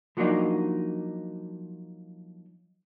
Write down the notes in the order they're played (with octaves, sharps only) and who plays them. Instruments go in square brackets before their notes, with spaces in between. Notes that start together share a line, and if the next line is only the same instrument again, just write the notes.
[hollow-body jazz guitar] F3 F#3 A#3 D4 D#4